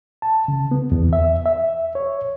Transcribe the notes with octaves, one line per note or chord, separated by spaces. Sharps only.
A5
C#3
B3
E2
E5
E5
C#5